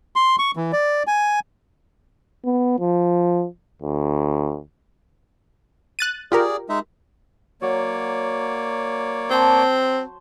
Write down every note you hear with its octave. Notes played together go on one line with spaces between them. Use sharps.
C6
C#6
E3
D5
G#5
B3
F3
D2
F#6 A6 D#7
F4 G4 G#4 A#4 D5
G#3 D#4 E5
F#3 A#3 C#5 D5
C4 C5 A5